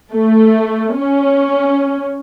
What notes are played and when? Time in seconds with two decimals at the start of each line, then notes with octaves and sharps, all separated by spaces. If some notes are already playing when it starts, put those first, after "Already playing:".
0.12 A3
0.96 C#4